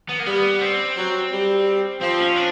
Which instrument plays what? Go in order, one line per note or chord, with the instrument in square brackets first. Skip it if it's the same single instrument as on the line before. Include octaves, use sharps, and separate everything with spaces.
[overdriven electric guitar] B3
A#3
[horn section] G3 [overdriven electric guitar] B3
[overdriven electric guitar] C4
[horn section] F#3
G3
[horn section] F3 [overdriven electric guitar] C4
[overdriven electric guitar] C#4
D4